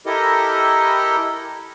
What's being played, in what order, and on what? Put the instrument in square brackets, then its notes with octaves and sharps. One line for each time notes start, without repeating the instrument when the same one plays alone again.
[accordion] E4 G4 A4 A#4 D#5